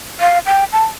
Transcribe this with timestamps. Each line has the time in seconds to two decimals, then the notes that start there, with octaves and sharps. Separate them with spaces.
0.20 F5
0.46 G5
0.73 A5